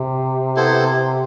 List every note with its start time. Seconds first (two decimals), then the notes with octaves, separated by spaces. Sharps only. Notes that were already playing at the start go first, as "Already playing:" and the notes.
Already playing: C3
0.56 B3 E4 A4 C5